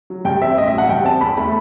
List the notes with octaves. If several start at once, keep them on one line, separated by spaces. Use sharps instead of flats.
F#3
G2 G5
C4 E5
A1 D#5
E5
F#3
F#5
G2 G5
C4 A5
E2 B5
A3 B5